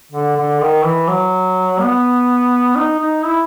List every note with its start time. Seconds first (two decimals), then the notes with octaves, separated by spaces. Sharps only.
0.12 D3
0.36 D3
0.60 D#3
0.84 E3
1.08 F#3
1.80 B3
2.76 D#4
2.99 D#4
3.24 E4